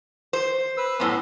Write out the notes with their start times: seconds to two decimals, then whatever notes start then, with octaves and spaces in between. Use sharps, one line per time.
0.33 C5
0.77 B4 E6
1.00 F#2 A2 B3 C#4